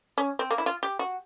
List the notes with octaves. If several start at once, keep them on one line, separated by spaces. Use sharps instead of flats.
C#4
C4
A#3
E4
F4
G4
F#4